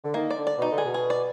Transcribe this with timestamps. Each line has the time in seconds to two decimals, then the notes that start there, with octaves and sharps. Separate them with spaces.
0.03 D3
0.14 D#3 A#3
0.31 D5
0.36 D3
0.47 D5
0.57 B2 D#4
0.70 D3
0.78 G#4
0.83 B2
0.94 G#4
1.10 D5